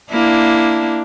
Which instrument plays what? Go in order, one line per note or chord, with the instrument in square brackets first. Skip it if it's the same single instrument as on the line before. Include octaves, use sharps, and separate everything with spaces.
[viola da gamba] A#3 D4 E4